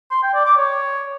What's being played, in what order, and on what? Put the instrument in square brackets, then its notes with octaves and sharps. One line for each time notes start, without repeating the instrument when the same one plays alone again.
[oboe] C6
G5
D5
D6
C#5